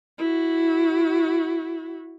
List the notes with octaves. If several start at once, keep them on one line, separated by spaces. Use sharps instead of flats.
E4 F#4